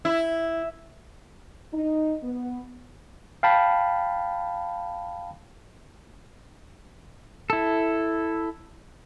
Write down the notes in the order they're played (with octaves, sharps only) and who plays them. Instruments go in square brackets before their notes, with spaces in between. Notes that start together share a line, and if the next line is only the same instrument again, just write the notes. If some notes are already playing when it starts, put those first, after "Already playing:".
[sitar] E4
[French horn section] D#4
B3
[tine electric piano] F5 G5 A5 B5
[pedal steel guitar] E4 A4